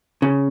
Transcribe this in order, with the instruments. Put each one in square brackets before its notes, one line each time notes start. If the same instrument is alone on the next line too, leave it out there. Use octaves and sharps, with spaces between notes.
[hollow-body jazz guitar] C#3